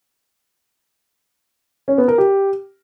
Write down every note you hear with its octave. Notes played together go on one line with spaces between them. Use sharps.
C#4
B3
A#4
G4